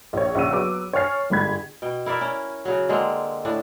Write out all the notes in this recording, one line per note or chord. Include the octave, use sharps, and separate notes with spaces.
A#1 C#5
A#1 C#3 F#5 C#6 E6 D#7
F#3 B3 D6 E6
C#5 G#5 C#6 F6 A6 C7
G1 G#2 B5 G#6
B2 G5
E4 A#4 D5 E5
C#4 E4
C#3 F#3
D3 G#3 A#3 C4
A2 D4